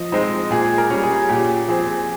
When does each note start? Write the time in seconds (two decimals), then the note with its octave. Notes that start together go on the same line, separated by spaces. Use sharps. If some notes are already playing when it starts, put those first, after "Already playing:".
Already playing: F3 D#5
0.12 G#3 C4 D#4
0.51 A#2 G#4
0.78 A#4
0.90 G3 C#4
1.03 G#4
1.29 A#2 G4
1.68 F3 C4 G#4